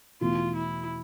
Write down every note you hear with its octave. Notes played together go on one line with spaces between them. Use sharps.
E2 B2 A3 E4 F4
E4